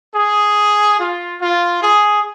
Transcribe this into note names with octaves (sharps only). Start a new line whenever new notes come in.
G#4
F4
F4
G#4